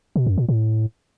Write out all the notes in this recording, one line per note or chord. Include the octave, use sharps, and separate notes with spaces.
B2
F#2
A#2
A2